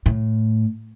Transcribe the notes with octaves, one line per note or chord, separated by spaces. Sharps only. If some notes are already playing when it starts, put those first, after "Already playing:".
A2